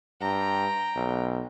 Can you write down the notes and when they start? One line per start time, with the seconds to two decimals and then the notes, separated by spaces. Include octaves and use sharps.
0.21 G2 G5 A#5
0.96 B1